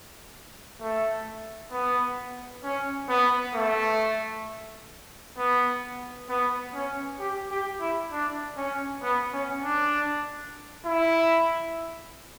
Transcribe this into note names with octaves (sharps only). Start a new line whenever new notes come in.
A3
B3
C#4
B3
A3
B3
B3
C#4
G4
G4
E4
D4
C#4
B3
C#4
D4
E4